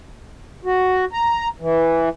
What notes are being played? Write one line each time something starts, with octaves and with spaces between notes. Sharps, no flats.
F#4
A#5
E3